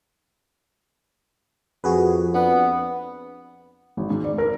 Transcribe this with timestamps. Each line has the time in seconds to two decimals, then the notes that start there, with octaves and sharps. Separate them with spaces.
1.84 F2 F#4 G#4 B4
2.34 B3 D4 F#5
3.97 G#1
4.10 G#2
4.24 D5
4.38 A#4